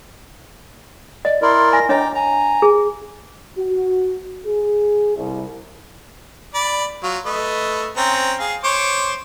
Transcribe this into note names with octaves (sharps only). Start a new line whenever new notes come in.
D5 D#5
E4 A#4 D5 C6
G#5 A#6
D4 C#5 D#5 G5 A#5 D6
G#5 A#5
G#4
F#4
G#4
C2
D5 B5
F#3 F4
A3 B4 D#5
C4 C#4 A#5
G#4 F5
C5 C#5 D6